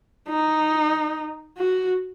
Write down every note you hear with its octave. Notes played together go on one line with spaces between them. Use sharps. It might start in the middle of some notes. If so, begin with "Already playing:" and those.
D#4
F#4